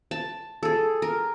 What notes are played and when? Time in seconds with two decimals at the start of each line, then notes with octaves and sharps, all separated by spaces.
0.11 A5
0.63 G#4 A4
1.02 A#4